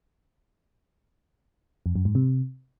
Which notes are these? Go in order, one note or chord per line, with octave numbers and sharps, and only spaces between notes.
F2
F#2
G#2
C3